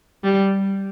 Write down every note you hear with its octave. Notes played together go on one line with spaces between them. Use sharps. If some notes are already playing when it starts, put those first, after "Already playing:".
G3